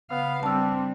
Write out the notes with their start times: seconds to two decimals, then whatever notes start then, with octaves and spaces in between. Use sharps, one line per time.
0.11 C#3 B3 F5
0.43 G3 C4 D4 A5 E6